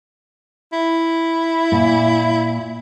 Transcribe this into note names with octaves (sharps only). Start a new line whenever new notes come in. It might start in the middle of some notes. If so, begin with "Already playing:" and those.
E4
A#2